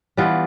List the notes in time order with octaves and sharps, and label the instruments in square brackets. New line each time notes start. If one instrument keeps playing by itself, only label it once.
[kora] E3 G3 B3 F4